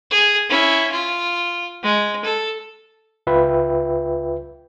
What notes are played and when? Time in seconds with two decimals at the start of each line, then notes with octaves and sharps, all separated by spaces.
0.11 G#4
0.49 C#4 E4
0.92 F4
1.83 G#3
2.24 A4
3.27 C#2 F4 B4 E5 G5